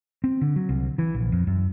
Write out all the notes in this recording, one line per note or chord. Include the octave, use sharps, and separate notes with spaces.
C4
D3
F#3
C2
E3
A#1
F2
F#2